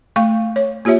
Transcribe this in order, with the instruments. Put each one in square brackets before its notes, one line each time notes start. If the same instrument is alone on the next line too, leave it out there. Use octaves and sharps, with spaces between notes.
[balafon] A3 F5 C#6
C#5
A#3 F4 G4 C#5 E5